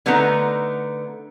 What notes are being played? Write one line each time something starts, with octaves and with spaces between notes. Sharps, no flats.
D3 A3 B3 D#4 A#5